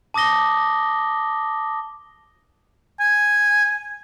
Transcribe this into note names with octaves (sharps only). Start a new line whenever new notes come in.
A5 D6 D#6 A#6 G7
G#5